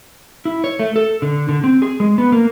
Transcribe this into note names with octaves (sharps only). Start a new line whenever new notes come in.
E4
C#5
A3
A4
D3
D3
C4
G#4
G#3
B3
A#3